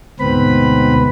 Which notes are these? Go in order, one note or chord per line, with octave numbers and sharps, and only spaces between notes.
D2 G#2 B2 C4 B4 B5